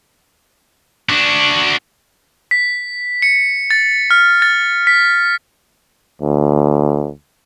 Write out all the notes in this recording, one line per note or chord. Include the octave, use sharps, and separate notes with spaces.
D4 F#4
B6
C#7
A6
F6
A6
B6
D2